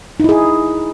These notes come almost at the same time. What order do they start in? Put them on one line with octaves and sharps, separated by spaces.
D#4 E4 G#4